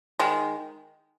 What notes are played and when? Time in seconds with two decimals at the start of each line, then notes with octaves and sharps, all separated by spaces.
0.19 D#3 G#3